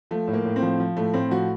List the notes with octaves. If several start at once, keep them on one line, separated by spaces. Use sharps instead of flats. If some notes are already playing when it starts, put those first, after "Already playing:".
F3 A3
A2
A#3
A2
C4
F3
F3
A2 A3
A2 C4
F3 F#4